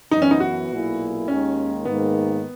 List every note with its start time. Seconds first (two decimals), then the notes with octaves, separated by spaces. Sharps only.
0.11 F#2 E3 B3 D#4
0.22 C#4
0.31 D#4
0.40 F#4
0.70 B1 A#2 A#3 E4 G#4
1.28 D#2 D#3 G#3 C#4
1.85 G#2 D#3 A#3 B3